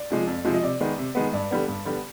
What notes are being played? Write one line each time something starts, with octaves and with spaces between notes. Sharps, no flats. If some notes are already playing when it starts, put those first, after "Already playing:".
Already playing: D5
C3 F3 G#3
F2
C3 F3 G#3
D#5
C3 D5
D#3 G#3 B3
C3
D#3 G#3 B3
G2 D5
D3 G3 B3
G2
D3 G3 B3